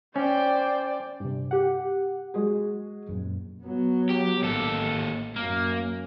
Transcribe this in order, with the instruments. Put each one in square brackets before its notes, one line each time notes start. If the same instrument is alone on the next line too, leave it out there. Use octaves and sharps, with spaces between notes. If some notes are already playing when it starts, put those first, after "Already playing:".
[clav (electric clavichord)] C#4 [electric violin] C5 G5 [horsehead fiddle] D5
[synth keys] G2 C3
G4 F#5
[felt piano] G#3 F#4 G#4
[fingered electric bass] F#2 A#2
[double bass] F#3 B3
[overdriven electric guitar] G4
[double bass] A1 [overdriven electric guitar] D#2 A4
[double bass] F#2 [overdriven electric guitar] A#3